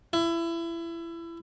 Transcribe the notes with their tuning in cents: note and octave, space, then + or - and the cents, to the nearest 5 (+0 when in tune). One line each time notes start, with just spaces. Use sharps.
E4 +25